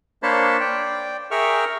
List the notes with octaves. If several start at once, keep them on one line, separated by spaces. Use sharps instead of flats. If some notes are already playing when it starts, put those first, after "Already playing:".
A#3 D4 C5 C#5 A5 B5
D5 G5
G#4 A#4 E5 G5 C#6 F6